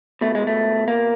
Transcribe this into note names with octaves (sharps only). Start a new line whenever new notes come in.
B2 A3
G#3
A3
A#3